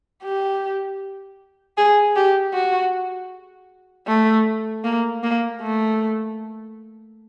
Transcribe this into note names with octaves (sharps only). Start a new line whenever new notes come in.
G4
G#4
G4
F#4
A3
A#3
A#3
A3